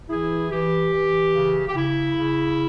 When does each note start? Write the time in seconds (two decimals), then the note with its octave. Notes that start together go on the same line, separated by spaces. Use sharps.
0.09 E3 E4 G#4
0.51 E3 G4
0.92 E3
1.33 C#3
1.68 G4
1.75 C#3 E4
2.16 C#3